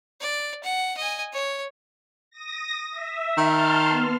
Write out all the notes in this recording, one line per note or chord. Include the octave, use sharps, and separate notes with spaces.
D5
F#5
D#5 G#5
C#5
D#6 A#6
E5
D#3 A5 C6 F6
B3